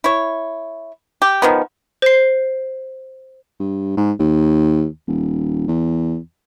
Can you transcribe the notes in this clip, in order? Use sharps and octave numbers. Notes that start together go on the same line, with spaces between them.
E4 C#5
G4
D#3 F3 B3
C5 C7
G2
G#2
D#2
D#1
E2